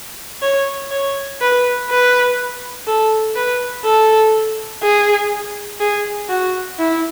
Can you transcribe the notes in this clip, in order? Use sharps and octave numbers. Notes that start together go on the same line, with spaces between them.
C#5
C#5
B4
B4
A4
B4
A4
G#4
G#4
F#4
E4